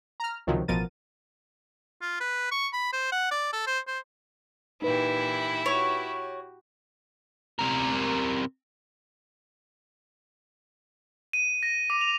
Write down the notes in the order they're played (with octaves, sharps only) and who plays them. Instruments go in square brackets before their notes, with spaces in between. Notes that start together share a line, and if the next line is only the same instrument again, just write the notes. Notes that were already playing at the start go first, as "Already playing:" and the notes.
[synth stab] A#5 F6
C#2 C3 D#3 F3 F#3
A1 B2 F3 A#4 A6 D#7
[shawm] F4
B4
C#6
B5
C5
F#5
D5
A4
C5
C5
[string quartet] A#2 E3 G4 [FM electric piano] D#4 B4 [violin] E4
[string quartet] F#4 G4 [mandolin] C#5
[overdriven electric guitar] C3 A#4
[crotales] D#7
A#6
D6
F7